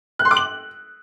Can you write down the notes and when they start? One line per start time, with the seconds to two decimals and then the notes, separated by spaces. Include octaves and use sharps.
0.19 F#6
0.25 C6
0.31 D6
0.37 F#7